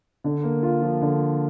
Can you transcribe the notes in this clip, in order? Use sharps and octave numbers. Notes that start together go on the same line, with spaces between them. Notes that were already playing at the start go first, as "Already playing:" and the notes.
D3
A#3
F4
F3
D3